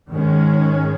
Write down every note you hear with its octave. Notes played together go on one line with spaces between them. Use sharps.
G#2 D#3 G#3 C#4